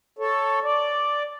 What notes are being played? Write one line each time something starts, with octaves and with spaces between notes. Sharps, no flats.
A4 C#5
D5